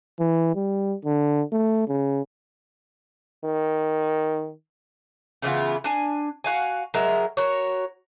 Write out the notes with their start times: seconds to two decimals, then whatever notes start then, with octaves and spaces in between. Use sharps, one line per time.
0.20 E3
0.55 G3
1.05 D3
1.52 A3
1.88 C#3
3.45 D#3
5.42 C#3 E3 B3 F4
5.84 D4 G#5
6.44 F#4 F5 G#5
6.94 F#3 G#3 A#4 E5
7.37 F#4 A#4 C#5